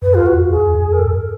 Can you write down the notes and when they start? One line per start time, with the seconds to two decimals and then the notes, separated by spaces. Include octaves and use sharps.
0.02 F#2 B4
0.14 E2 F4
0.26 F#4
0.34 F2
0.50 E2 G#4
0.75 F2
0.93 A#4
0.98 G2 A4
1.15 A#4